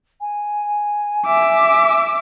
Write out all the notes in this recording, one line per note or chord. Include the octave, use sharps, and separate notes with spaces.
G#5
E5 D6